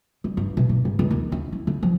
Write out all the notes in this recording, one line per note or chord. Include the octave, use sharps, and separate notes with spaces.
G3
G2
B2
G2
G#2
C#2
D#2
C#4
E4
D3
F3